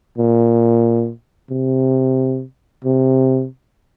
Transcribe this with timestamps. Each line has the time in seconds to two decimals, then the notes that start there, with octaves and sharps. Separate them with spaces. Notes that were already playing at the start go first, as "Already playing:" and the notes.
0.18 A#2
1.51 C3
2.84 C3